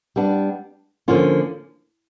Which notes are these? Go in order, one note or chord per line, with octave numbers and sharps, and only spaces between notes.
G3 B3 D4
D3 F3 A#3 C#4 F4